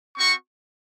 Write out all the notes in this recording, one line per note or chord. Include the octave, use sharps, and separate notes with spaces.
C4 F#4 C#6